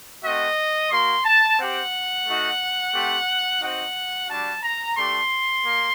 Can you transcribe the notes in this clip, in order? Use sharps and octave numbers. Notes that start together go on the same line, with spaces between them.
A3 C4 F#4 D#5
A#3 F#4 C6
A5
C4 G4 F#5
A3 D#4 F#4
A3 C4 G4
C4 D#4 F#4 F#5
G3 D4 F#4 A5
A#5
A3 D4 G4 C6
A#3